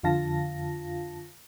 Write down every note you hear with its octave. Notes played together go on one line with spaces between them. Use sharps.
F2 D3 F4 F5 A5 A#6